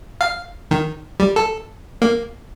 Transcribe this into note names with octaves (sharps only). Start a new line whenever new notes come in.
F5
D#3
G3
A4
A#3